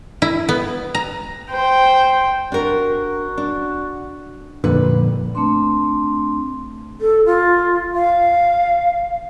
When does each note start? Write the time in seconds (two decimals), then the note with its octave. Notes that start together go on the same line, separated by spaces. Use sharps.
0.22 E4
0.49 B3
0.95 A#5
1.51 C5 G5
2.52 D4 F#4 A#4
3.38 D4
4.64 F2 A#2 D3 G3 B4
5.35 A3 C4 D4 C6
7.01 A4
7.26 F4
7.95 F5